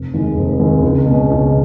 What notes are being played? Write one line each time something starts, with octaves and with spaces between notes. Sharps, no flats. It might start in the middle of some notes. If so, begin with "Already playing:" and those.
Already playing: F1
D#2 D#3 G#3
F1
D#2 D#3 G#3
C#2
B2 G#3 C#4
C#2